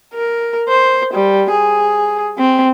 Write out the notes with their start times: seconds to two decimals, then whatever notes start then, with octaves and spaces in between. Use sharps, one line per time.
0.14 A#4
0.69 C5
1.14 G3
1.50 G#4
2.38 C4